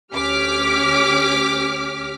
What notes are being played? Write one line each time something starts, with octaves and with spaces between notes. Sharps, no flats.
D2 C#4 G4 D6 F6 B6